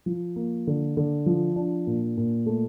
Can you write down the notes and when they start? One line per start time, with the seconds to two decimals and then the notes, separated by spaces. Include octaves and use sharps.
0.06 F3
0.36 A#3
0.67 D3
0.97 D3
1.26 F3
1.56 D4
1.87 A#2
2.17 A#2
2.46 A3